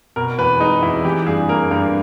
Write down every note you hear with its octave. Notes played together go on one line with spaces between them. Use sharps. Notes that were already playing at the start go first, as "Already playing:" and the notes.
B2 A#4
E2 B4
G#3 D#4
E2 E4
E3 G4
G2 G#4
A#3 A#4
G2 A#4